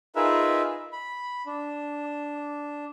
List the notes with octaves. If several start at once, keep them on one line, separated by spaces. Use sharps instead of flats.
D#4 F4 G#4 A#4 B4 E5
B5
D4